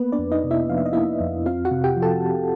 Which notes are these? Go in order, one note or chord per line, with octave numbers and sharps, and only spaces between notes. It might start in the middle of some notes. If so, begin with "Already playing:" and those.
Already playing: A#3 B3 B4
D4 D5
F2
D#4 D#5
C3
E4 E5
F3 F5
E5
D#5
A#3 E4 E5
F2
C4 F4 F5
F#4 F#5
C3
G4 G5
F3
A4 A5